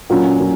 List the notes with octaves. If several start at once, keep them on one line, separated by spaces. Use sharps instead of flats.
A#2 F#3 C#4
A#2 F#3 C#4